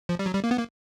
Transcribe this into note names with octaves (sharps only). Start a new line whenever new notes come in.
F3
G3
F#3
G3
A#3
B3
A#3